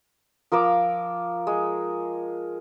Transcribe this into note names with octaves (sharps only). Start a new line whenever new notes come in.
F3 A#4 D6 E6
G#3